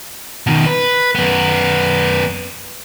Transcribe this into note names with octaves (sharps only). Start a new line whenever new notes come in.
B2 D#3
B4
F#2 B3